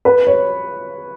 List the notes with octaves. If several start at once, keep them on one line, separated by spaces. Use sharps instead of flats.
B4
C#5